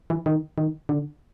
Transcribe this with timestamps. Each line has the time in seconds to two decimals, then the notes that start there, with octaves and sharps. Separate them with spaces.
0.10 E3
0.26 D#3
0.58 D#3
0.89 D3